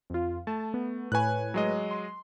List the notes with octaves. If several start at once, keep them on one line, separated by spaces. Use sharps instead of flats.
F2 F4
A3 A5
B3
A2 B4 C#5 G#5 F#6
F#3 G#3 D#5
C6